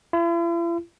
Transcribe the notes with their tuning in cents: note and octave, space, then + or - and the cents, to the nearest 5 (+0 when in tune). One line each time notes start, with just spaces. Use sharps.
E4 +45